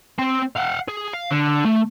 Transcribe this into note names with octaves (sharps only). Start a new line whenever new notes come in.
C4 G5
F5 F#5
G#4
F5
D3
A3